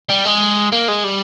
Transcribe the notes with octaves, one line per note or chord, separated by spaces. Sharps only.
G3
G#3
A#3
G#3
G3